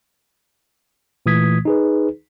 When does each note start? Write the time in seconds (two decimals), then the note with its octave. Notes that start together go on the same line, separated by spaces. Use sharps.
1.26 A#2 E3 A3 D#6 G#6 B6
1.65 D#4 G#4 B4